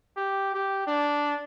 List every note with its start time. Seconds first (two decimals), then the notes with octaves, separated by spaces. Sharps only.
0.17 G4
0.54 G4
0.87 D4